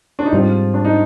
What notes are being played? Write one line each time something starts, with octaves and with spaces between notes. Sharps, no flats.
D4
D#4
G#2 F3 G3 C4 F4
D4
D#4